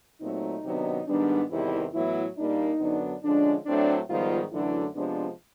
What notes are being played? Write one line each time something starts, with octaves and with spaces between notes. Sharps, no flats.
A#2 F#3 A3 C4 D#4
C3 D#3 F#3 B3 D4
G#2 D#3 G3 B3 D4
E2 C3 D#3 E3 G3 E4
A2 E3 F#3 B3 E4
A#2 G3 A#3 D4 D#4
F#2 D3 F#3 B3 D4
D3 F3 G#3 C#4 D4
A2 F#3 A3 C4 D4
G#2 D#3 F3 G3 B3 F4
F#2 D3 E3 F#3 A3 D4 E4
C3 F3 G#3 B3 D4